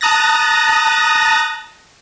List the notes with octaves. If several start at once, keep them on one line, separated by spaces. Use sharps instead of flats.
A5 A#5 D#6 F#6 A6 A#6